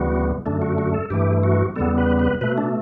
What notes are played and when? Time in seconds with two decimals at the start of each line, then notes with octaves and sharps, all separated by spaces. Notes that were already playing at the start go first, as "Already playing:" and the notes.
Already playing: D2 C#3 E3 G3 B3 F#4
0.46 F#2 D3 A3 D4
0.62 F#4
0.78 F#4
0.94 A4
1.10 G2 E3 A3 G4
1.43 F#4
1.76 E2 C#3 G3 B3 A4
1.98 B4
2.19 B4
2.41 B2 A3 B4
2.58 D4